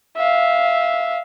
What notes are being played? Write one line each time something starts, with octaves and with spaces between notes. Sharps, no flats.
E5 F5